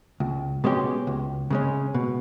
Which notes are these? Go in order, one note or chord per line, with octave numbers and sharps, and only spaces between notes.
C#2
B2 G#3 C#4 G4
C#2
C#3 G#3 C#4
B2